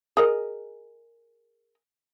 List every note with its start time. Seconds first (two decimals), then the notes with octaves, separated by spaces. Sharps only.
0.17 G#4 A#4 D#5